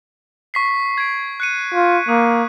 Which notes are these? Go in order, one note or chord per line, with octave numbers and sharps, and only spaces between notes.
C#6 B6 C7
G#6 D7
F#6 C#7 D#7
F4
A#3 D#6